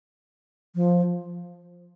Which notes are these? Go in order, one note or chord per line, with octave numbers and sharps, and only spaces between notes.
F3